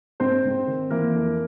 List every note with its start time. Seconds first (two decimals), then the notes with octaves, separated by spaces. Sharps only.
0.20 G#2 C4 C5
0.44 G#2
0.67 D#3
0.91 E3 A#3 A#4
1.14 F2